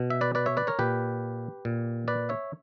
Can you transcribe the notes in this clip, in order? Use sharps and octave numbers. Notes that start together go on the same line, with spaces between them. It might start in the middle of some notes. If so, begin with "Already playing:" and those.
Already playing: B2
E5
B4 D5
B4 D5
C#5 E5
B4 D5
A#4 C#5
A#2 G4 B4
A#2
B4 D5
C#5 E5